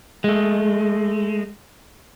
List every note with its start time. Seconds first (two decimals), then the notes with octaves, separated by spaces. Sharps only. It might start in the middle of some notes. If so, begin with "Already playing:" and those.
0.24 G#3 A3